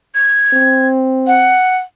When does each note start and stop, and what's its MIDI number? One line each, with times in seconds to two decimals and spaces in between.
0.15 0.87 92
0.53 1.57 60
1.27 1.77 78